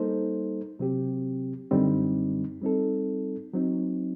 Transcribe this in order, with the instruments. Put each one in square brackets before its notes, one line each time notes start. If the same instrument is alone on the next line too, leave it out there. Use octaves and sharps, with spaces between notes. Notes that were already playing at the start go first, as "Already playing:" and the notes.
Already playing: [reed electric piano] G3 A#3 D#4 A4 C5
C3 F#3 C4 G4
F#2 D3 G3 C4 D#4
G3 C4 D#4 A4
F#3 C4 D#4